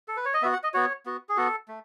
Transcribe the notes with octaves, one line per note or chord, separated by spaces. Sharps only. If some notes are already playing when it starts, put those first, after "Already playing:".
A4
B4
C#5
D#5
B3 F#4 E5
F#5
D#5
B3 F#4 C#5
B3 F#4
G#4
B3 F#4 A4
A3